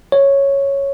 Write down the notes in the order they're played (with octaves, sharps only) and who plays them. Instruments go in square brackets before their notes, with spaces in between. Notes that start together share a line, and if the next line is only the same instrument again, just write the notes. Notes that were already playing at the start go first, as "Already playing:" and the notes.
[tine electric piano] C#5